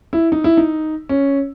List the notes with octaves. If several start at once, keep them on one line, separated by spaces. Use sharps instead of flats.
E4
D#4
E4
D#4
C#4